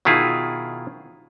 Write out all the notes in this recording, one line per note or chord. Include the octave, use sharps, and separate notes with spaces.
B2 D#3 E4 F4 G#4